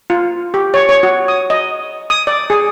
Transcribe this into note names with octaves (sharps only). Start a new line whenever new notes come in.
F4
G4
C#5
C#5
F#4
D#6
D#5
D#6
D5
G#4